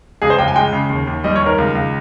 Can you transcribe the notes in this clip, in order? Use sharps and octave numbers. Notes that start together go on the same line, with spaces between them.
C#2 G#4
C5
C#2 G5
G#5
G#3 G5
C#3
D#2
D#2
G3 D#5
C#5
D#3
A#4
C#2
C#2